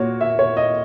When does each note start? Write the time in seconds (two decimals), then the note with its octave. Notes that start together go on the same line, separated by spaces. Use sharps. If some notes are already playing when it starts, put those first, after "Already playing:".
Already playing: A#2 A#3 F#4 C#5
0.21 E5
0.39 C#5
0.57 D#5